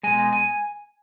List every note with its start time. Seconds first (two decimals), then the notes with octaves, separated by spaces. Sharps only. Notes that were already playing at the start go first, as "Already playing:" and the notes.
0.03 B2 G#3 G#5
0.33 G#5